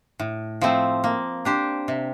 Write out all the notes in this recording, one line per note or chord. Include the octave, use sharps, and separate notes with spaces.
A2
F3 A3 C4
A#3
D4 G4 C5
C3